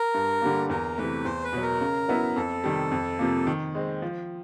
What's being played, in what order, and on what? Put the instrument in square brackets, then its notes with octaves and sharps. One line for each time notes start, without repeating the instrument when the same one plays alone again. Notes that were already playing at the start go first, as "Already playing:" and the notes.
Already playing: [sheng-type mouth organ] A#4
[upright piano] G2
D3 G3 A#3
[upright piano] E2 [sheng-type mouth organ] A#4
[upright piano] C3 E3 A3 [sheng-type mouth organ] B4
[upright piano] E2 [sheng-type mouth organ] C5
[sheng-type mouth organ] B4
[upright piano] B2 F#3
[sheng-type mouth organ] A#4
[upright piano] C#3
F#3 B3 E4
[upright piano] F2 [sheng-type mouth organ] A4
[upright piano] C3 D#3 G3
F2
C3 F3 A#3
D#3
G#3 C4
F3